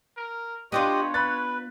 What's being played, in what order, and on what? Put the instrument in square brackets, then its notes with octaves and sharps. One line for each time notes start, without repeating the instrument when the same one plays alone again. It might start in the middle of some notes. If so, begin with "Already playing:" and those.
[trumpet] A#4
[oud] B3 D4 F4 [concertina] G4 D#5 D#6 [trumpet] C#5
[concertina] B4 [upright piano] B5 F#6 A6